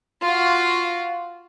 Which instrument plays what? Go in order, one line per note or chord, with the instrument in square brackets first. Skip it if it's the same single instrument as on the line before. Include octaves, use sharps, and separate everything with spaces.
[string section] F4 F#4